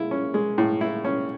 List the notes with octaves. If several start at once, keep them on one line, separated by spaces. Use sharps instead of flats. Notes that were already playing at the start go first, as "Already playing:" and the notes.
Already playing: G#3 E4
C#4
G#3
A2
E4
C#4